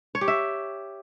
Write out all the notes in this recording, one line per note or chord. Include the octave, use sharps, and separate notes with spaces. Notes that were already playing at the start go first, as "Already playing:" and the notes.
C#5
G4
E5